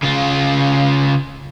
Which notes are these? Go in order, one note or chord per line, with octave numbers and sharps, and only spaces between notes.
C#3 F4